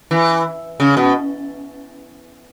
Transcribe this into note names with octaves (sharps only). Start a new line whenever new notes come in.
E3
C#3
B2